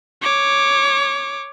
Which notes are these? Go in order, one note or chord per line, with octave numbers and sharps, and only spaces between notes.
C#5 D6